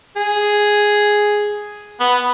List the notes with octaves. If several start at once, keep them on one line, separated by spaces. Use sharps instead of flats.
G#4
B3